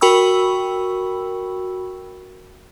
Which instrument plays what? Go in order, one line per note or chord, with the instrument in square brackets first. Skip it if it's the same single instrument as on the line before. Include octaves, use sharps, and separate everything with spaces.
[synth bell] F#4 A#4 G5 B5 C#6 E6